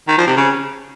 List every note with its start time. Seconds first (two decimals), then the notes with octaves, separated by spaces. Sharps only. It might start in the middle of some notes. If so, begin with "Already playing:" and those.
0.08 D#3
0.18 F3
0.27 C3
0.36 C#3